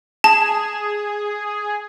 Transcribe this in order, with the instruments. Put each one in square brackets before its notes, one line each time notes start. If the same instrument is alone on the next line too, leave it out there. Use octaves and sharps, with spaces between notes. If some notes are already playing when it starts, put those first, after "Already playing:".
[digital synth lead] G#4 [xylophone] A5